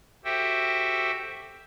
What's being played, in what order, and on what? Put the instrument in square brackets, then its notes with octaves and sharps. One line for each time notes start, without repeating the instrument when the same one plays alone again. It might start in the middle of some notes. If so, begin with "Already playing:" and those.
[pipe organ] F#4 G4 A4 C5 E5 G5